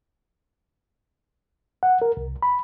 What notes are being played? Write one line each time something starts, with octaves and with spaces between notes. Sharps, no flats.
F#5
A#4
C2
B5